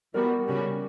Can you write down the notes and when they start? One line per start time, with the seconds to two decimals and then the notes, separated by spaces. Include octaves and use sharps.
0.14 E3 G3 B3 F#4 A#4
0.47 C#3 G3 C#4 F#4